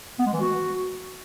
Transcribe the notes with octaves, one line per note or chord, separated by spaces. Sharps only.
B3
G#3
E3
F#4